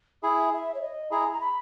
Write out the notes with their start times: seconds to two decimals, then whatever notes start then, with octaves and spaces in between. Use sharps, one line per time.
0.23 E4 G#4 E5
0.53 E5
0.74 C#5
0.82 D#5
1.11 E4 G#4 A#5
1.33 A#5
1.41 B5